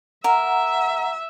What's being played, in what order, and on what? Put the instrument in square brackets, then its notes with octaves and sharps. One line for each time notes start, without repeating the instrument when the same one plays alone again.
[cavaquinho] A#4 [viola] E5 [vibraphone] F#5 A#5